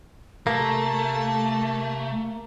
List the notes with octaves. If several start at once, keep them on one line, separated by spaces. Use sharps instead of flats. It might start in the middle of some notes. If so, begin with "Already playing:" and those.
C3 A3 A#3 A5